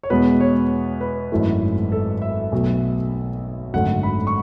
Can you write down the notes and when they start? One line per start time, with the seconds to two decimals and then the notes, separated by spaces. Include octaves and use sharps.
0.03 C#5
0.10 E2 B2 G#3 B3 B4
0.40 C#5
1.01 B4
1.32 G#1 F#2 E3 A3
1.92 A4
2.22 E5
2.52 B1 B2 F#3 A3
3.74 G#1 F#2 D3 A3 F#5
4.03 B5
4.27 C#6